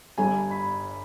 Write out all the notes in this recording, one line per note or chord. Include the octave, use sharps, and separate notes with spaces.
G1 G2 G3 G#5
B5